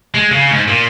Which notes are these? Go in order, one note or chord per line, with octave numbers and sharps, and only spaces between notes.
G#3
C#3
G#2
A#2